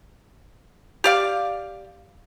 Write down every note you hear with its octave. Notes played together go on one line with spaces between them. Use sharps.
G4 D5 F5